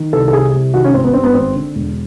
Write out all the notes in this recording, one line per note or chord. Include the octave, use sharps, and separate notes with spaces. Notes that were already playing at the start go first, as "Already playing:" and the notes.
Already playing: D#3
C2 A4
A4
C3 G#4
C2
D#3 F#4
C#4
G#1 C4
B3
G2 C4
B3
G#1 C4
D3
E1